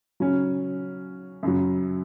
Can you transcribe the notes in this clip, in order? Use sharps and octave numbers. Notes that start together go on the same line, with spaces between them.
C#3 F#3 C#4
F#2 C#3 F#3